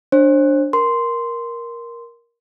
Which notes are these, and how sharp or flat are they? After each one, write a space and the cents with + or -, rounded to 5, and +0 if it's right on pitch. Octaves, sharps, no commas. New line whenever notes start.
D4 +0 C5 +35
A#4 +10 C6 -5